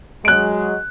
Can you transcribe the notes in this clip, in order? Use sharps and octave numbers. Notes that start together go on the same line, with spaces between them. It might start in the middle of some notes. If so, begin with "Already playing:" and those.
F#3 G#3 F#6 D7